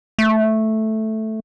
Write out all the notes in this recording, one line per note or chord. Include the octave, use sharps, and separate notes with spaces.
A3